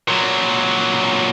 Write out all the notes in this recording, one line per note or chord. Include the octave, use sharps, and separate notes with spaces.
A#2 F#3